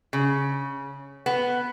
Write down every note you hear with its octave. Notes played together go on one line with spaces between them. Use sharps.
C#3
B3